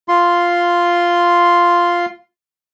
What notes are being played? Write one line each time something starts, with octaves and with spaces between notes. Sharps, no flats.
F4 C6